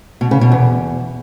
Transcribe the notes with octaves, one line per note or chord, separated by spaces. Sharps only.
B2
C#3
B2
E2